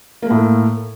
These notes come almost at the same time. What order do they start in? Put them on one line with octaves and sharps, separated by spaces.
A#3 A3 A2